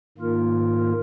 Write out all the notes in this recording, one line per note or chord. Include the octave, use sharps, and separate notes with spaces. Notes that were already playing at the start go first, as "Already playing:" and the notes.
G#2 D#3 A#3 F4 A#4